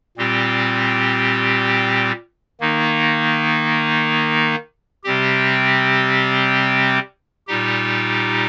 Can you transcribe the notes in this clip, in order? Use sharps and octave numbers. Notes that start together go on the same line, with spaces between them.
A#2 G3 C4 G4
D#3 A#3 D#4
C3 G3 C4 G4
A#2 G3 D#4 G4